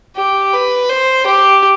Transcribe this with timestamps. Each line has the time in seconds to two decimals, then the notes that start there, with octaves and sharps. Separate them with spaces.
0.16 G4
0.53 B4
0.89 C5
1.26 G4